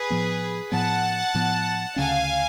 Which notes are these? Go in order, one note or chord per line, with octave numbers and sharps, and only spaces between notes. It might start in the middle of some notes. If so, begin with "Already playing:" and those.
Already playing: G#4 B4
A2 F3 B3
A2 F3 B3 F#5 A5
A2 F3 B3
D2 C#3 F#3 C#4 F5 G#5